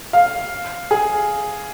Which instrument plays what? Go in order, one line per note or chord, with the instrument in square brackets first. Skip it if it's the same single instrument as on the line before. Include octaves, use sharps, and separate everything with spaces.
[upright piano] F5
G#4